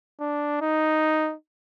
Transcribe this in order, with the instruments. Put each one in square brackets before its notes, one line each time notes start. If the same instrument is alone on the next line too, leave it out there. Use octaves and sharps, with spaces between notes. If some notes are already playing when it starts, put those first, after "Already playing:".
[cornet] D4
D#4